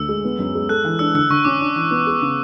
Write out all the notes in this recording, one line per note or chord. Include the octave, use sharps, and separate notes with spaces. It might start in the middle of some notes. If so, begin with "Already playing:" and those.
Already playing: D2 E6
G#3
B3
F#2
G#3
A4 F#6
E3
D4 E6
D3 E6
D3 C#6
C#4 D6
D4
E3
B3
G#4
C#3